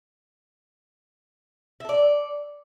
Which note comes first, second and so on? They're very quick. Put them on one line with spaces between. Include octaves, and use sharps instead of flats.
E5 A4 D5